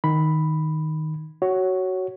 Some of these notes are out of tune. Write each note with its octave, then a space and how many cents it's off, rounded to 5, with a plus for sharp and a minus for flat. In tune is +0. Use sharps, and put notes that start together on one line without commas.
D#3 +0 B5 +0
F#4 +15 C#5 +0